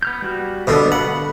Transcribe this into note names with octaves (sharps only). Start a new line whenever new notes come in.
B3 F6 G6
G3 F#4
B2 D3 G3
F#5 B5